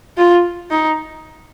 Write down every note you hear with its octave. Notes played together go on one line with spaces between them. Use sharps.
F4
D#4